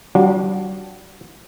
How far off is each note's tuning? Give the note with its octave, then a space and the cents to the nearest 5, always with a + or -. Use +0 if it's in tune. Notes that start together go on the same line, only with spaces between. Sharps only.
G3 -40 D4 +0 F#4 -30